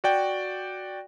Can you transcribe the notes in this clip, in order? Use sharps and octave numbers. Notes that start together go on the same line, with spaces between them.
F#4 D5 G5